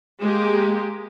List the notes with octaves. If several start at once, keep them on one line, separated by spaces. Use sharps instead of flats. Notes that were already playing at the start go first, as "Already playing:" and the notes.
G#3 A#3 G4